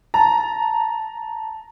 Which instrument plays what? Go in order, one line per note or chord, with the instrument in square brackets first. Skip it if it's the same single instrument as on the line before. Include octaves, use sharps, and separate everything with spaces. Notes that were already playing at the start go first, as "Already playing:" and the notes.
[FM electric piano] A5 [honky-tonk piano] A#5